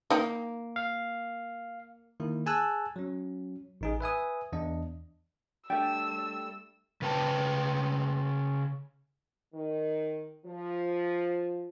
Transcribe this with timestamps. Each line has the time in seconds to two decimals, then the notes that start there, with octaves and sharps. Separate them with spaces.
0.10 A#3 D#4 G5
0.76 F5
2.20 D#3 A#3 E4
2.46 G#4 G#5 A5 E6 F#6
2.96 F#3 C#4
3.81 A1 D#4 G#4
4.01 B4 E5 G#5 D#6
4.52 E2 D4 D#5
5.70 G3 A3 D4 G5 E6
7.02 C#3 B4 G5 A5
9.53 D#3
10.45 F3